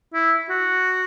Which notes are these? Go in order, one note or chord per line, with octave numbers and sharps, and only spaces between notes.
E4
F#4